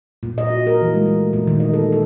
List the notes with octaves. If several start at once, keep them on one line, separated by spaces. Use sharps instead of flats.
A#2
D#5
F#4
A#4
E3
G#3
A3
A#2
D#3
D#5
A4
A4